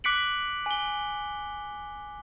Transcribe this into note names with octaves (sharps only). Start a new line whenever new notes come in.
D6 F#6 B6 C#7 D7 F#7
G#5 G7